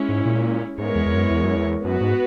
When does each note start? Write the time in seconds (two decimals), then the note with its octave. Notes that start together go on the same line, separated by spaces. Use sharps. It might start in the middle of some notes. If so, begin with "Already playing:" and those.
Already playing: G#3 C#4 E4
0.09 G#2
0.26 A#2
0.78 G#2 G#3 B3 E4 A#4 C#5
0.96 E2
1.06 E2
1.14 F#2
1.31 E2
1.44 F#2
1.56 E2
1.84 F#2 B3 F#4 B4
2.01 G#2